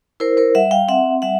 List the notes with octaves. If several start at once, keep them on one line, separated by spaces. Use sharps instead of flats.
E4 A#4 C5
A#4 C5
G3 E5 F#5
F5 G5
C4 E5 F#5
G3 E5 F#5